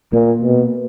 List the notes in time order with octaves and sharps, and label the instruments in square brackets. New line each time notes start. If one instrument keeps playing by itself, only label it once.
[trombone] A#2 [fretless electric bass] A#3
[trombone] B2